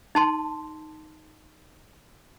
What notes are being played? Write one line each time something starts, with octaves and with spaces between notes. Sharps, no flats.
D#4 A5 C6